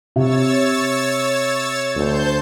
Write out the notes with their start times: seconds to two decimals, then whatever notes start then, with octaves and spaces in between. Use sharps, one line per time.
0.16 C3 C#5 E6 A6
1.96 D2 C5 A5 G6